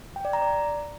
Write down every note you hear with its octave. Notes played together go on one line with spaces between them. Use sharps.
G5
D5
A#5
D5